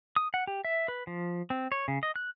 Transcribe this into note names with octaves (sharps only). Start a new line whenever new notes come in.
D#6
F#5
G4
E5
B4
F3
C4
C#5
C#3
D#5
F#6